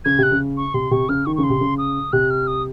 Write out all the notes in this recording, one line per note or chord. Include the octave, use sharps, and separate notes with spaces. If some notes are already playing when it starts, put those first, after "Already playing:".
C#3 G#6
C3 F#6
C#3
C#6
C3 C6
C3 C#6
C#3 F6
D#3 C#6
C#3 C#6
C6
C3
C#3
D#6
C3 F#6
F6
D#6